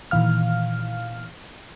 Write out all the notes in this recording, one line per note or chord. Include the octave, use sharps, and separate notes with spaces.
A#2 D#3 E3 F5 F6